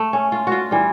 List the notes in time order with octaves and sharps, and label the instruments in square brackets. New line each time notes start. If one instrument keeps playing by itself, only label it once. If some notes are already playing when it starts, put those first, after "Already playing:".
Already playing: [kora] A3
C#4
F4
F4 F#4
E3 G3